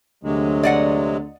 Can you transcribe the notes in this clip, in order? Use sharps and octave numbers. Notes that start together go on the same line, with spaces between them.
D2 C3 F#3 G#3
D5 D#5 F#5